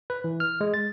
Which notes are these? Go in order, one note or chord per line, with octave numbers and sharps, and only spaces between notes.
B4
E3
F6
G#3
A6